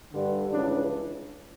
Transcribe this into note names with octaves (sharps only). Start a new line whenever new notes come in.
G2 D3
C#2 C#3 E3 D4